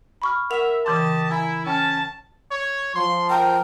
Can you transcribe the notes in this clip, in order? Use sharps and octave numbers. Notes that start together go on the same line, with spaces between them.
B5 C#6 F6
A#4 E5 F#5 C#6 E6 F7
C#3 E3 G4 D#5 A5 C6 D6
E4 G#5 A#5
C#4 G5 A5 F6
C#5
F3 C6
A#4 G5